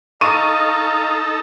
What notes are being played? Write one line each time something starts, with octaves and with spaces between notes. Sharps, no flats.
D#4 A4 D#5 F5 A#5 C#6 D#7